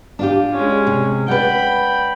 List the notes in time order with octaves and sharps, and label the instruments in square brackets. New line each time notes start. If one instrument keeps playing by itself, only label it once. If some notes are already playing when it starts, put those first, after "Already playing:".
[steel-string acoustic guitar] D4 F4 G4
[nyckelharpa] G#3 C#4
[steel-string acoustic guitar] C3
[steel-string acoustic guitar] B4 D5 F#5 [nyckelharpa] G5 B5